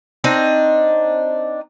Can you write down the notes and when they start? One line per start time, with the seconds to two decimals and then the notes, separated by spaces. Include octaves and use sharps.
0.24 C4 D4 D#4 D#5